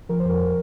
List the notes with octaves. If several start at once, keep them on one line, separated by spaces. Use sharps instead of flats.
F3 A#4
C5
F2 A#4